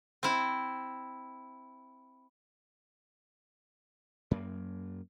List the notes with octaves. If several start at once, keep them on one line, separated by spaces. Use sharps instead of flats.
C4 E4
F#2 A#3